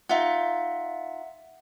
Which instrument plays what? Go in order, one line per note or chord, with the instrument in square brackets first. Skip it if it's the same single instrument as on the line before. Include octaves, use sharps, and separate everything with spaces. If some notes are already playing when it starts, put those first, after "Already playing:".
[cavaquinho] D#4 F4 [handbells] E5 F#5